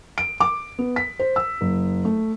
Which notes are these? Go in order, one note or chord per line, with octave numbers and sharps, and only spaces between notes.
D7
D6
B3
B6
C5
E6
F#1
A3